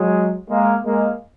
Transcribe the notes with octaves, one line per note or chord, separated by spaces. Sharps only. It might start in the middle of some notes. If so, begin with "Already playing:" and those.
Already playing: F#3 G#3
G#3 A#3
G#3 A#3